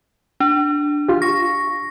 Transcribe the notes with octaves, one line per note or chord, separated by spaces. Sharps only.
D4
F4 G4
C#6 A#6